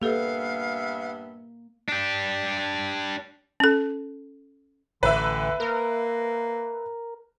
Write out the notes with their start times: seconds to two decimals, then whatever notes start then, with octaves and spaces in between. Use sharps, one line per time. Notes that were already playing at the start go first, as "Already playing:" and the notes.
0.02 G2 A#3 B3 G4 A4 B4 E5 F5
1.88 D4 G4
3.60 C#4 A4
5.03 A1 D3 B4 E5
5.60 A#3 A#4